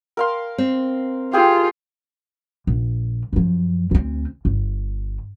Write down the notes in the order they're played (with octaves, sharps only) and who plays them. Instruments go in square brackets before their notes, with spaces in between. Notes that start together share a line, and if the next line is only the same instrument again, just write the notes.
[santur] A#4 F5 C6
[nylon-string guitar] C4
[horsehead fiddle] F4 [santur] G4 G#4
[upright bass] A#1
F#2 F3
D2 C4
G1